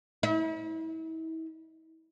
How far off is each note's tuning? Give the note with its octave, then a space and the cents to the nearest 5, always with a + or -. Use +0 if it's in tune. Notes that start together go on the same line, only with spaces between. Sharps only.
E4 -40